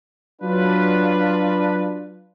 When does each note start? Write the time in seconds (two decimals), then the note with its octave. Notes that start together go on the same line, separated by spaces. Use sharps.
0.42 F#3 D4 F4 B4